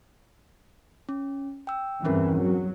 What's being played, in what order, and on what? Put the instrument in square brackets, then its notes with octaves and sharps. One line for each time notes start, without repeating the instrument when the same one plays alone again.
[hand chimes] C#4
G5 E6
[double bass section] E2 G2 E3 [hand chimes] C4 C#4 A#4
[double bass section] F#3